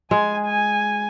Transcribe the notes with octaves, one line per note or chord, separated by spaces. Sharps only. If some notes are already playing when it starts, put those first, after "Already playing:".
G#3 G#5
G#5